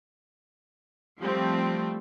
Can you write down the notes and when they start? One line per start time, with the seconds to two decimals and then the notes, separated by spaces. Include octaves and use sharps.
1.19 F3 G3 A3 C4